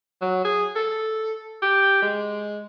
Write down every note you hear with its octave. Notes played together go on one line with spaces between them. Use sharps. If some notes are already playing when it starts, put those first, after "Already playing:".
F#3
G#4
A4
G4
G#3